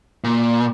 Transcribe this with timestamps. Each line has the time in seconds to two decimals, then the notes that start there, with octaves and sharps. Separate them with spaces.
0.24 A#2